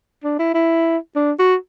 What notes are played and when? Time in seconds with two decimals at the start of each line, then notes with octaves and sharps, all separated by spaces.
0.24 D4
0.39 E4
0.54 E4
1.16 D4
1.39 F#4